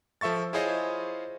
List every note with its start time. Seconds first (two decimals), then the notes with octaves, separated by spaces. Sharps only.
0.21 F3 A4 E5 C#6 A6
0.53 E4 F4 G#4 C5 C#5 D#5